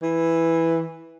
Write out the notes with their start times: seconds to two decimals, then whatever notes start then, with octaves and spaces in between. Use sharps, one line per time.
0.03 E3